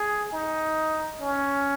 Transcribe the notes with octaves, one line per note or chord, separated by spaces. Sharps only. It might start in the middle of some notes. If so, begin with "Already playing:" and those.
Already playing: G#4
D#4
C#4